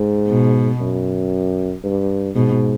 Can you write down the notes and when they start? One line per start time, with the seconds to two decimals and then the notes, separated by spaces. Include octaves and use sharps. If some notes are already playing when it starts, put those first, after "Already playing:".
Already playing: G#2
0.28 B2
0.80 F#2
1.84 G2
2.35 G#2 B2